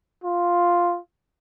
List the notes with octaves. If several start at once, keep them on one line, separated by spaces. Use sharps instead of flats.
F4